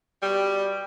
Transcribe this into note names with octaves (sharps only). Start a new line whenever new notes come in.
B2 G3